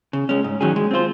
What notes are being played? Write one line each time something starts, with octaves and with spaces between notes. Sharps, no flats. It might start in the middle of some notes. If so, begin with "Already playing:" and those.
C#3
G#3 C#4
G#2
D#3 F#3 C#4 G#4
G#3
C4 F4 C5